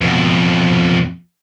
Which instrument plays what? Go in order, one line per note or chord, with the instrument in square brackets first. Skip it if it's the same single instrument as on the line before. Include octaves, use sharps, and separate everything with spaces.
[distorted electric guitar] F2 B2